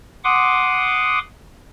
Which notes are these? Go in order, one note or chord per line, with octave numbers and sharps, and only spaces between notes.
F#5 C6 D6 D#6